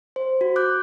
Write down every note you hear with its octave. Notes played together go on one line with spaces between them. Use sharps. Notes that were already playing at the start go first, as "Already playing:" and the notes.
C5
F#4
D6 F#6 G6